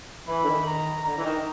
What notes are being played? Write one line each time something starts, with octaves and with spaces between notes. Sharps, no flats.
E3 B5
D3
D#3
A#5
D3 A#5
E3
D#3